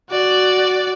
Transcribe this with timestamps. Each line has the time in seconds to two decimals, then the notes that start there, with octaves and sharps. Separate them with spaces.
0.10 F#4 D5